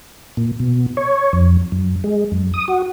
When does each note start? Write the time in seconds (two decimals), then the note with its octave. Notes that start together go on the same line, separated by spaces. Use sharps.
0.37 A#2
0.60 B2
0.97 C#5
1.33 F2
1.72 F#2
2.04 G#3
2.32 F#2
2.54 D#6
2.68 F#4